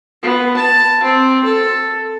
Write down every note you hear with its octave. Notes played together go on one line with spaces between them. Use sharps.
B3
A5
C4
A4